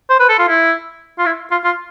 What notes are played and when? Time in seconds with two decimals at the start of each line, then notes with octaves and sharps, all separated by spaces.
0.10 C5
0.20 B4
0.29 A4
0.39 F4
0.49 E4
1.19 F4
1.26 E4
1.51 F4
1.64 F4